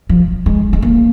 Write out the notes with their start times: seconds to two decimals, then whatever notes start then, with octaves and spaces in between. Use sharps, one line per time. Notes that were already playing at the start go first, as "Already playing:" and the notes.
0.09 F3
0.46 G#3
0.73 G#3
0.82 A#3